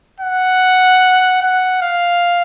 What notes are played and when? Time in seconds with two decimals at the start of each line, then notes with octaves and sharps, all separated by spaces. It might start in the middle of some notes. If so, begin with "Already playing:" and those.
0.20 F#5
1.42 F#5
1.82 F5